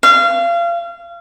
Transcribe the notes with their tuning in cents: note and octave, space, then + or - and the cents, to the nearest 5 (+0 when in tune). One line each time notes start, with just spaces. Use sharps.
F5 -30